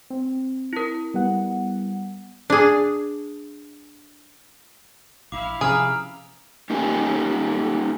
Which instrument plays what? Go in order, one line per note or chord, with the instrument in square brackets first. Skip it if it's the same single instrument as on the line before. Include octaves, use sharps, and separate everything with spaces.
[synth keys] C4
[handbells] E4 A#4
[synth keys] G3 B3 F#5
[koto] D4 G#4
[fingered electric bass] A#1 [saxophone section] E4 F5 [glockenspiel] D6
[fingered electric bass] C3 F3 C#4 [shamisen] G#4 [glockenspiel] A#5 F6 D7
[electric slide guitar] A#3 C#4 D#4 G4 A#4 G#5